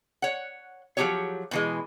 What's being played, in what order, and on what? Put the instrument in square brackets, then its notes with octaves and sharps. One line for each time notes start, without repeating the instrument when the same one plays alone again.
[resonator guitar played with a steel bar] C#5 F#5
F3 F#3 D#4 G4 G#4 C#5
B2 E3 G#3